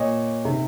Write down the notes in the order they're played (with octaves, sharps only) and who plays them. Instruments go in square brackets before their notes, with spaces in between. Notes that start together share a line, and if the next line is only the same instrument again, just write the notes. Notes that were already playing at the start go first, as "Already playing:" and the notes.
Already playing: [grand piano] A#2 C#5 D#5
C3 D#3